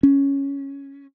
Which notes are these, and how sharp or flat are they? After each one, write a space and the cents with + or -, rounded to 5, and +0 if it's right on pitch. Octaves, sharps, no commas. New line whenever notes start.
C#4 +0